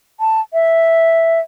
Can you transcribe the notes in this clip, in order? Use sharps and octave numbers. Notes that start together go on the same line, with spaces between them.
A5
E5